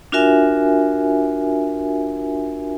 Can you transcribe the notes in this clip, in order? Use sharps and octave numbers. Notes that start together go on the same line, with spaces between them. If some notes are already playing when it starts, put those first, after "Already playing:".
D4 F4 F#4 A#4 E5 G#5